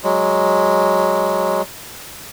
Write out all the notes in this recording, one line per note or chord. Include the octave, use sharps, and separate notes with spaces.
F#3 G#3